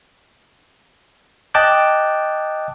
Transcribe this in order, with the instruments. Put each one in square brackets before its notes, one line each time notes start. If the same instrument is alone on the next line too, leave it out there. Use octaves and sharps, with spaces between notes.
[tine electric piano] D#5 G5 A5 D6 F#6 G6